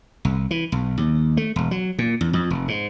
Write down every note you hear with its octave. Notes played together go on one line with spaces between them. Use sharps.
C2
E3
B1
D#2
A3
E1
F#3
A#2
E2
F2
F1
G#2